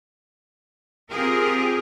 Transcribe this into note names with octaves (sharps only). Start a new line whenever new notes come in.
C4 F4 G4 G#4 A#4